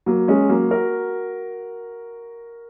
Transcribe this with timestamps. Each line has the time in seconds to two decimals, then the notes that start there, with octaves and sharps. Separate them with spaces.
0.06 F#3 A#3
0.28 G#3 C#4
0.49 F#3 A#3
0.71 F#4 A#4